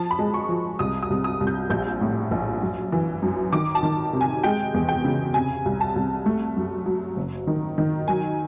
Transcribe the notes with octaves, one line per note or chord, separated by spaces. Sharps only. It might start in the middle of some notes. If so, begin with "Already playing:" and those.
Already playing: F3 A5
B5
G#3
C#6
F3
C2 D#6
D#6
C2
D#6
C2
G6
A#1 G6
A2
A#1
F#2
E3
F#2
D#3 D6
A5
D#3
C3
G#5
G#3 G5
E2
G5
C#3
C3 G#5
C2
A5
C2
A3
F#2
F#3
F#1
D#3
D#3
F#3 G#5